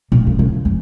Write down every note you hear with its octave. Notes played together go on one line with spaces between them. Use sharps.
A#2
C#3
C#3
F2